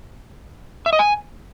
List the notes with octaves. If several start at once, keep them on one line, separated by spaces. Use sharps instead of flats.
E5
D#5
G#5